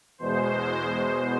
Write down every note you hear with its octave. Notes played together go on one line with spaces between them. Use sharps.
E2 B2 G#3 C5